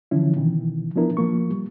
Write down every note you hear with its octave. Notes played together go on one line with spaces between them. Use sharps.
D3 E3 F3 C#4 E4
B2 D#3 E3
F3 B3 D4 E4 A#4
F3 A#3 C#6
G3